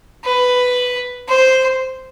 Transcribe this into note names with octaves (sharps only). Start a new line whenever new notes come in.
B4
C5